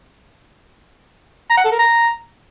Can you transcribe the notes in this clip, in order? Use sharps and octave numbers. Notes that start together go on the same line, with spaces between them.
A#5
F#5
A4
A#4
A#5